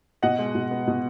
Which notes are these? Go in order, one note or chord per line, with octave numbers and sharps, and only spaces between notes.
B2 D#5 F#5
G#3
B2
B3
B2